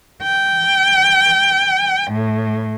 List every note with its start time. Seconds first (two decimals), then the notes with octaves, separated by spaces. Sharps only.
0.23 G5
2.12 A2